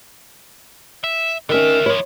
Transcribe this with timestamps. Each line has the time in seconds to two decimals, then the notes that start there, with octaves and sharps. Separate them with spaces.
1.04 E5
1.49 D3 D#3 C#4 A#4 E5
1.86 F3 E4 C#5